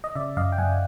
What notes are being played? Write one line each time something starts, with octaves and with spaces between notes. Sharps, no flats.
D#5
C#3 D5 E5
F#2 D#5 F5
G5
F#2 F#5 G#5